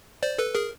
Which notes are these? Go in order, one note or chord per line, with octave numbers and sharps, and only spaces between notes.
C5 D5
A4 B4
G#4 A#4